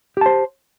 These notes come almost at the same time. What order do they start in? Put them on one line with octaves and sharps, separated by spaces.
G4 A5 C5